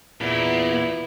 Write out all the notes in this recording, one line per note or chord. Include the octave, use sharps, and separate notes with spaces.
E2 A#2 B3 E4